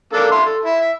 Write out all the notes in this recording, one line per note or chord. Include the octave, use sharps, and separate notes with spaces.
A#3 D4 A4
E4 C6
A4
E4
E5